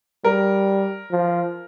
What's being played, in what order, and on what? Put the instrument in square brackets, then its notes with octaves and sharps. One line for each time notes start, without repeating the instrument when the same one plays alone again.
[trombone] G3 [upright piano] A#4
[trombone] F3